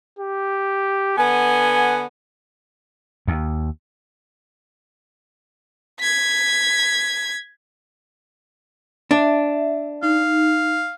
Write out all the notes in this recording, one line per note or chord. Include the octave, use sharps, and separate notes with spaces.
G4
D3 B3 G#5
D#2
G#6 B6
D4 E5
D#4 F5